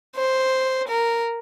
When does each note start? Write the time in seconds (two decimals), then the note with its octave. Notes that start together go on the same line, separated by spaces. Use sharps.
0.16 C5
0.88 A#4